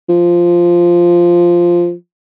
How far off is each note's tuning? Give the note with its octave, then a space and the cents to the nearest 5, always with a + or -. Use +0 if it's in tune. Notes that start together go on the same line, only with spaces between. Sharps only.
F3 -5